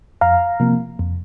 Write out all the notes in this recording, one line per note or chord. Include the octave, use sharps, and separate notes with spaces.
F2 F5 A#5
C3 F3 A#3
F2